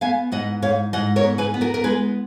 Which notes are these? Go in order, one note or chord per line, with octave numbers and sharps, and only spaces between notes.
B3 F5 G#5
G#2 D#5 F#5
G#2 C#5 F5
G#2 D#5 F#5
A#4 C#5
B3
G#4 B4
B3
F#4 A#4
A#4
G#3 G#4 B4